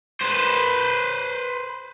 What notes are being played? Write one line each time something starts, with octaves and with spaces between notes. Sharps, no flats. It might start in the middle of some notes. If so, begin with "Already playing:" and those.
B4 C5